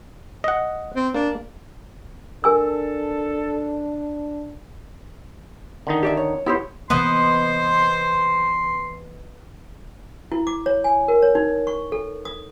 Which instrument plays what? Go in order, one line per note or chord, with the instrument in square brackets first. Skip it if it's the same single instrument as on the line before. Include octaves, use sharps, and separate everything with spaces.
[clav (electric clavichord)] D#5 F#5
[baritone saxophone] C4
[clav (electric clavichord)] A#3 [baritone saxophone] D4
[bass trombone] D4 [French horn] A4 [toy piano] A#4 G#5 E6
[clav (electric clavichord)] D3 D#3 D#4
[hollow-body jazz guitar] G4 D5 E5
C#5
[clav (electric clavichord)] B3 C5 [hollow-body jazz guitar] E4 G4 C#5
[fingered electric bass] C3 E3 A#3 [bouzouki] B3 D#5 [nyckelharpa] C5 [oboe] C6
[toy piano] E4
D6
C#5
G#5
A#4
C#5
D#4
C#6
A4
D#6